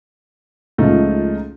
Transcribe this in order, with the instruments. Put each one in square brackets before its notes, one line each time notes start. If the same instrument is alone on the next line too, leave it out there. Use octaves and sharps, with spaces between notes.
[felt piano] C#2 [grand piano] F3 A3 D#4